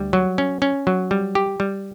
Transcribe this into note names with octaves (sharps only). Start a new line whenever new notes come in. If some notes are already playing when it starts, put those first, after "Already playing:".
Already playing: D2 G3
F#3
C#4
C#4
F#3
G3
G4
G3